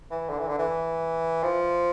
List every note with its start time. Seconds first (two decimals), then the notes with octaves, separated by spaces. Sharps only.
0.11 E3
0.30 D3
0.40 E3
0.49 D3
0.59 E3
1.43 F3